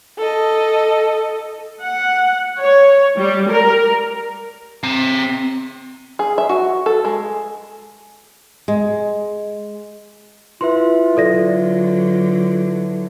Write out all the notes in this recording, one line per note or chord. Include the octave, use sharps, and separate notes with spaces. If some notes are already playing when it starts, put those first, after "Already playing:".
A4 D#5
F#5
C#5
G3
A#4
C4 A#5
G#4
E5
F#4
A4
G#3
G#3
E4 F4 B4 E5 C6
D3 F#3 A4 D5 A#6